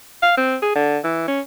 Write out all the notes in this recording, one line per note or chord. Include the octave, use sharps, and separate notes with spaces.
F5
C4
G#4
D3
E3
C#4